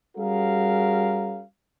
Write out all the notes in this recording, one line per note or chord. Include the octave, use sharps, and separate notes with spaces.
G3 C#4 F#4 G#4 A#4 F5